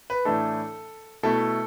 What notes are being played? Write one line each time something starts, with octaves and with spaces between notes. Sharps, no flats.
B4
A2 E3 A3 D4 A4
B2 A3 E4 A4